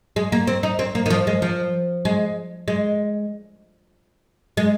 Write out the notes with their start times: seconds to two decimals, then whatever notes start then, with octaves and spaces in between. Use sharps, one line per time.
0.16 G#3
0.32 A#3
0.47 C4
0.63 D#4
0.79 C4
0.95 A#3
1.06 D#3
1.10 F3
1.27 G#3
1.42 F3
2.05 G#3
2.68 G#3
4.57 G#3